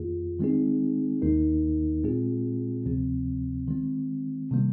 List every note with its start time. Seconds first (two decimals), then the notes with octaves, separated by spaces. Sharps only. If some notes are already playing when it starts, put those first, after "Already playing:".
Already playing: F2 D#3 A#3 F4 G#4
0.40 D#3 G#3 C4 D#4 G#4
1.22 D#2 D#3 A#3 D#4 A#4
2.03 A#2 G#3 C4 F4 G#4
2.86 D2 C3 F3 C4
3.68 D#3 G#3 C4
4.51 C3 D#3 G3 A#3